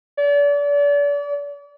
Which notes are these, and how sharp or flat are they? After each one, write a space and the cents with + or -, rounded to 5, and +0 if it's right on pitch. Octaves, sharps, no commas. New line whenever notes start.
D5 -35